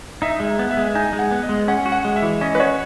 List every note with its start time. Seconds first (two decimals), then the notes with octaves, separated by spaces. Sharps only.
0.22 D#4 E5
0.40 G#3
0.46 E5
0.59 B3
0.71 E5
0.77 G#3
0.95 D#4 G#5
1.13 G#3
1.19 F#5
1.31 B3
1.43 D#5
1.49 G#3
1.68 C#4 F#5
1.86 F#4
1.92 F#5
2.05 G#3
2.16 E5
2.22 E3
2.41 C#4 D#5
2.55 B4
2.60 F#4 C#5